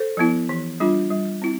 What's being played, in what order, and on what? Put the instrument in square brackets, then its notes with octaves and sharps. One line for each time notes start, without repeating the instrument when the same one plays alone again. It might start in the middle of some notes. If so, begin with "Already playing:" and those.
Already playing: [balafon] A4 C5
F3 B3 E4
E3
G3 D4 F4
G3
C4 E4